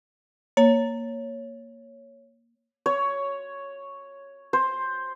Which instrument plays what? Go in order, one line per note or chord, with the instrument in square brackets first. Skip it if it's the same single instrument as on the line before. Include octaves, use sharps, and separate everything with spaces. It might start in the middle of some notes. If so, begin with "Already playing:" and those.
[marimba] A#3 [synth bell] C#5
[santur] C#5
C5